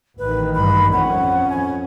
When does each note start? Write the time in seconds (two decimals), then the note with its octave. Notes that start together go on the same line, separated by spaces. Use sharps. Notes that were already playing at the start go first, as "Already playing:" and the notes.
0.19 A1 D#3 B4
0.55 G2 B5
0.93 F2 C#4 F#5
1.50 G#5